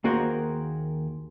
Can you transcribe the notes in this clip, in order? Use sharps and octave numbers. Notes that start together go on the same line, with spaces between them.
D#2 A#3 F#4 G#4 A#4 C5